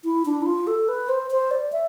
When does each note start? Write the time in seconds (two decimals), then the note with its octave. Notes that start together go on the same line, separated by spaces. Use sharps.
0.04 E4
0.26 D4
0.42 E4
0.46 F4
0.67 A4
0.88 B4
1.09 C5
1.31 C5
1.51 D5
1.72 E5